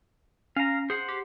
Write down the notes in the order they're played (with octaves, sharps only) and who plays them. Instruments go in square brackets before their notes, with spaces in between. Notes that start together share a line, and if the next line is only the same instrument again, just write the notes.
[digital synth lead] C#4 [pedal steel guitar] F5 A#5
[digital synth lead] G#4 [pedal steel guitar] C5 F#5
[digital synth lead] G4